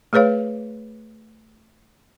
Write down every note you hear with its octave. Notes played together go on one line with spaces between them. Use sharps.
A3 G#4 B4 C#5 F5